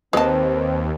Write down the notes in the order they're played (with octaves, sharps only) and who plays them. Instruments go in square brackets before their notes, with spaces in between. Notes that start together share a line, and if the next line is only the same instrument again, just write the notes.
[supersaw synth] D#2 [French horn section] C4 [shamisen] G#4 A5 [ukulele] B4 D#5